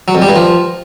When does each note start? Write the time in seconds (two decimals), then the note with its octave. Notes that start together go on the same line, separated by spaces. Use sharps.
0.08 F#3
0.15 F2
0.22 G3
0.29 G2
0.36 F3